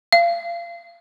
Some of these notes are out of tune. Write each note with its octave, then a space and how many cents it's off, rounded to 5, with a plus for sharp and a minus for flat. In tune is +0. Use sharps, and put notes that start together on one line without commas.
F5 -30